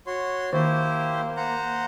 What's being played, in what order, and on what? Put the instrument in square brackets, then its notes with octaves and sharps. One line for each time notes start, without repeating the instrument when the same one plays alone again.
[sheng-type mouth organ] F#4 C#5 C6
[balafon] D#3 [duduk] A#3 [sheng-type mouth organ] E4 G4 C5
[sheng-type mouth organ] C5 F#5 A#5